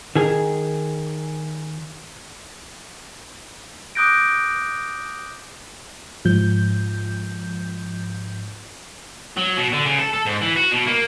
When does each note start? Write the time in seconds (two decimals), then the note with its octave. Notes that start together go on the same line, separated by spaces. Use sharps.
0.15 D#3 G#4
3.95 D6 D#6 F#6 G6 A#6 D7
6.25 G#2 F3 G6
9.37 F#3
9.57 B2
9.73 D3
9.86 C#3
9.99 A4
10.13 A4
10.26 G#2
10.42 E3
10.56 F#4
10.72 B2
10.87 A#3